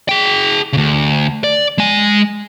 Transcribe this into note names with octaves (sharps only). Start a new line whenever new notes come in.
G#4 G5
D2 C#3
D5
G#3 G#5